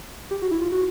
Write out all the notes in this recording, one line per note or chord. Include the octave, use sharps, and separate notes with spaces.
G4
F#4
E4
F4
F#4